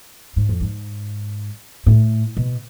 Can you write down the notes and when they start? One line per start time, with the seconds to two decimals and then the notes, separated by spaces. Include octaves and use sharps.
0.36 G#2
0.49 F2
0.61 G#2
1.86 A2
2.37 B2